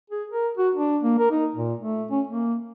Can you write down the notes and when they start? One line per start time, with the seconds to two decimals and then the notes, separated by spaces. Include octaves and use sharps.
0.10 G#4
0.30 A#4
0.57 F#4
0.75 D4
1.03 A#3
1.18 A#4
1.31 D#4
1.55 A#2
1.79 A3
2.10 C#4
2.27 A#3